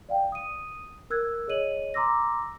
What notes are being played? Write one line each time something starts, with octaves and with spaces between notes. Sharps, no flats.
D5 F5 G5
D#6 D#7
A#4 E6 F#6 G#6
G#4 C#5 D#5 D#7 F#7
A#5 C6 D6 E6 A#6